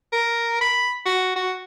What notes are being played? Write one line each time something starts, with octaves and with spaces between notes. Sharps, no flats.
A#4
B5
F#4
F#4